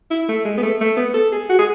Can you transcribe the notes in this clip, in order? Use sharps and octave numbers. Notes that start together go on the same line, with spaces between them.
E4
A3
G#3
B3
A3
A3
B3
A4
G#4
F#4
G#4